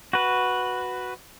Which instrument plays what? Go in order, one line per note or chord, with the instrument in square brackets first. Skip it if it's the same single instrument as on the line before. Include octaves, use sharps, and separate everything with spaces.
[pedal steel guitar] F#4 B4